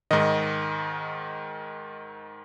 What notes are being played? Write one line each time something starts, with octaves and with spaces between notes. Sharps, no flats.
G#2 D#3 D#5